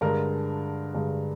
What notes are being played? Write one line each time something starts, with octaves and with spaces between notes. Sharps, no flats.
G2 D3 G#3 A#4 D5
G2 D3 G#3